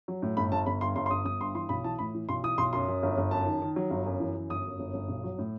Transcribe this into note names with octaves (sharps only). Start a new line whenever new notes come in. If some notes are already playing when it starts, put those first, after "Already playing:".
F#3
A2
G1 B5
G1 A5
G1 B5
G2 C6
G1 C6
C6
G1 D#6
G1 D#6
G2 C6
E3 C6
B1 B5
E3 A5
A2 B5
E3
B1 C6
E3 D#6
B1 C6
F#2 C6
F#2
G1
G1
F#2 A5
D#3
D#3
F#3
G1
F#2
E3
F#2
G1 D#6
F#2
G1
G1
B1
F#3
A2